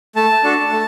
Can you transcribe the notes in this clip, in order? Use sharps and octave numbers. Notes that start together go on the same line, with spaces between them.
A3 A5
D4 F#4 A4
A3